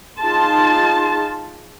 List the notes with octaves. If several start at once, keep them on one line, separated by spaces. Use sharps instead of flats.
D#4 F4 G#4 A5 C6